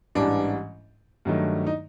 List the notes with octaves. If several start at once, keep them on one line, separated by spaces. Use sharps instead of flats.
A1 G#2 E3 G3 D4
G2 D#3 F#3 A3
D#4